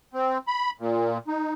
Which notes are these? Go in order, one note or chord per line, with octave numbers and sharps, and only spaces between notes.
C4
B5
A#2
D#4